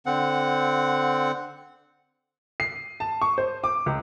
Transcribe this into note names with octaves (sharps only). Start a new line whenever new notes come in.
D3 C4 F#5
C7
A5
C#6
C5
D6
C#2